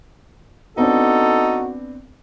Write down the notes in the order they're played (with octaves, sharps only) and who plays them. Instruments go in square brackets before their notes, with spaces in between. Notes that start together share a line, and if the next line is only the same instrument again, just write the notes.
[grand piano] B3 C4 D4 [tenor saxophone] D#4 [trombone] F#4 [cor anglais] A4